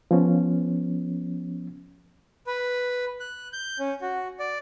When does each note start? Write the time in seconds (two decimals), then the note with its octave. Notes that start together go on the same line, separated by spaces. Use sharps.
0.11 F3 B3 C#4
2.47 B4
3.20 F#6
3.53 G6
3.79 C#4
4.01 F#4
4.39 D5